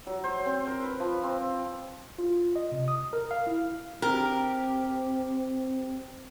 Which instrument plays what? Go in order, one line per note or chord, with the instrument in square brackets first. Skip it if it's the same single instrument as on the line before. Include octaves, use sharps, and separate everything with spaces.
[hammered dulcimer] F#3
C5
C4
A#4
B4
F3
C4
[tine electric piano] F4
D#5
C3
D#6
A#4
F5
E4
[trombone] C4 [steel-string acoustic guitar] G4 [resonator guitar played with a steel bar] A#4